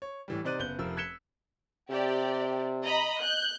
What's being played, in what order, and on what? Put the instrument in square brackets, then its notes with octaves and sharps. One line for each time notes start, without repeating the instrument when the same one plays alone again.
[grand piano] C#5
A2 E3 G3
C3 D#4 C5 D5 F#6 D#7
F#1 B3 F#6 G6 G7
F1 F3 A#4 E6
F#6 G#6 B6 C#7 E7 G7
[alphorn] C3 [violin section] G4 D5
[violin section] D#5 A#5 B5
F#6 G6